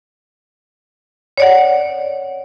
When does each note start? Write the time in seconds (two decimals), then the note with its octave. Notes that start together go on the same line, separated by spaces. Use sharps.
1.38 C#5 D5 F#5